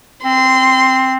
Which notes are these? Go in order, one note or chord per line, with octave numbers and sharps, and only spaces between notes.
C4 C6